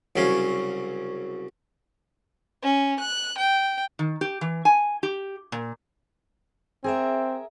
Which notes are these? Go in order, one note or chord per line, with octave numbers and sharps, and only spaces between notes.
C2 C#3 F#3 C#4 F5
C#4
F#6
G5
D#3
G4
E3
G#5
G4
A#2
C4 G#4 A#4 E5